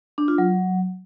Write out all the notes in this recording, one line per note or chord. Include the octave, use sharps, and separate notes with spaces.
D4
F4
F#3